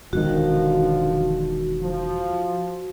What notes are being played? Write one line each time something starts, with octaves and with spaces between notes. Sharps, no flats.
E1 D3 D#3 F3 F#4
F3